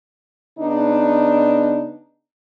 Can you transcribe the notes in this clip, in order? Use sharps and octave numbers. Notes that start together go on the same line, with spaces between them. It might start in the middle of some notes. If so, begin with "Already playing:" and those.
C#3 B3 D4 D#4